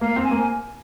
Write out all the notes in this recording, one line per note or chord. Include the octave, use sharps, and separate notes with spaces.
A#3 F5
C4
G#5
A#3